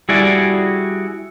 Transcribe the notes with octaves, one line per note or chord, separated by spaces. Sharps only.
G3 E4 F#4 G#4 D5